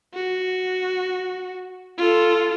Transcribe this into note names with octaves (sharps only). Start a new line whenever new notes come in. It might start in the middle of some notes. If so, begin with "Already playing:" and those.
F#4
F4 A4